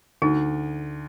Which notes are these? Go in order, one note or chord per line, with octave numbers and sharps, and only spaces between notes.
D2 D#4